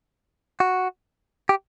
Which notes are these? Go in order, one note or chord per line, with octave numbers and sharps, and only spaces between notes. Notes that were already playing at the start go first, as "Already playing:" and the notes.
F#4
G4